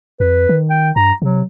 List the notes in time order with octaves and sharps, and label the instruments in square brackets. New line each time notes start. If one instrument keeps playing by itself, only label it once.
[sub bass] F2 [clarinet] B4
[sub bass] D#3
[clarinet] G5
[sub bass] G2 [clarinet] A#5
[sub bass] C3 [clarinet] F#3